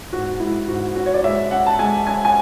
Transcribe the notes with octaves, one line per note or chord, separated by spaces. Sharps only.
G#2 F#4
G#3 E4
G#2 F#4
C#4 F#4
C#5
D5
G#3 E5
C#4 F#5
A5
G#3 G#5
C#4 G#5
G#5